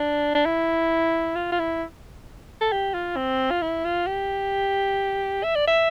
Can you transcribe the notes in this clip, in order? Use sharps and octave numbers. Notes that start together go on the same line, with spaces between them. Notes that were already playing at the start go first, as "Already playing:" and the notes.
Already playing: D4
D4
E4
F4
F4
E4
A4
G4
F4
C4
F4
E4
F4
G4
E5
D5
E5